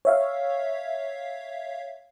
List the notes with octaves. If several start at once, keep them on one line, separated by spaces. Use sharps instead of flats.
C#5 E5 F5